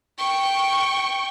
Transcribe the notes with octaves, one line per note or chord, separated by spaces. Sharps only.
G5 C#6